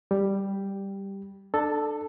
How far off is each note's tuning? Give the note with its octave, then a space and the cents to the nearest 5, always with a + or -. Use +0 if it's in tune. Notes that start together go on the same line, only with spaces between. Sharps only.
G3 +0 G4 +0
D4 +25 A4 +0 A5 +35